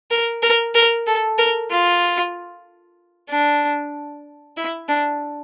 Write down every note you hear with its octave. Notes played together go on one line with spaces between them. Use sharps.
A#4
A#4
A#4
A4
A#4
F4
D4
E4
D4